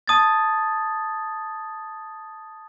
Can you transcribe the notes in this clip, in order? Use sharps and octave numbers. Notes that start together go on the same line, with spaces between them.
A5 D#6 G#6 A6